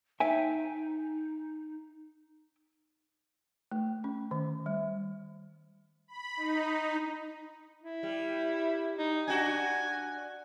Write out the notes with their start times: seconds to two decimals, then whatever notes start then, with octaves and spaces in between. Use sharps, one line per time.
0.20 D#4 E5 G5 G#5
3.71 A3
4.04 C#4
4.31 D#3
4.66 G3
6.08 B5
6.37 D#4
7.83 E4
8.03 G3
8.98 D#4
9.28 D4 F#4 G#5